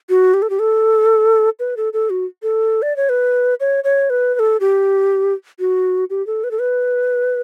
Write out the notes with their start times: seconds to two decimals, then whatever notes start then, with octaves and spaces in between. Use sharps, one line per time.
0.09 F#4
0.34 G4
0.42 A4
0.50 G4
0.59 A4
1.60 B4
1.77 A4
1.93 A4
2.10 F#4
2.43 A4
2.82 D5
2.96 C#5
3.09 B4
3.60 C#5
3.84 C#5
4.10 B4
4.35 B4
4.39 A4
4.60 G4
5.59 F#4
6.10 G4
6.27 A4
6.44 B4
6.51 A4
6.59 B4